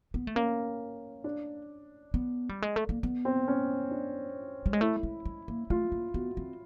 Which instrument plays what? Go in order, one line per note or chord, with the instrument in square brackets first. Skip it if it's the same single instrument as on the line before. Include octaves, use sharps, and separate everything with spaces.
[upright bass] B3
A3
[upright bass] A#3 [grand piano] C#4
[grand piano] D4
[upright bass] B3
G3
G#3
A3
A#3
B3
[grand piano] C4
C#4
D4
[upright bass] G3
G#3
[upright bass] A3 [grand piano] E4
[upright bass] G#3
G#3
A#3
[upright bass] A3 [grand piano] F4
[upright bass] A#3
[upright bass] B3 [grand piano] F#4
[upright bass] C4